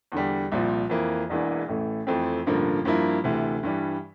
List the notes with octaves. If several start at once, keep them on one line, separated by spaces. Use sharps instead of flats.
E2 D3 G3
C2 A#2 F3
F2 E3 A#3
E1 E2 E3 A#3 D4
A1 A2 E3 A3
F2 E3 A3 C4
A1 G2 D3 F3 A#3
G2 F3 A#3 E4
D2 C3 E3
G2 E3 G3